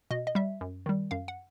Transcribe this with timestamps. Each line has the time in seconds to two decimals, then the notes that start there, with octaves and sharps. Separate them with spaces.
0.11 B2 D#5
0.27 D#5
0.35 G3 E5
0.61 F#2
0.86 D#3 G3
1.11 F#2 F5
1.28 F#5